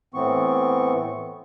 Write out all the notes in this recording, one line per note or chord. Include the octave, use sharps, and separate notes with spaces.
A2 E3 B3 C4 C#6